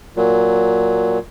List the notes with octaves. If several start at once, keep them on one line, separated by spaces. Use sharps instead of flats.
A#2 F#3